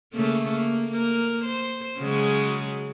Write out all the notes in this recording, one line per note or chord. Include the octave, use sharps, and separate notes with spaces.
C#3 A3 A#3
A#3
A#3 A#4
C5
C#3 F#3 G#3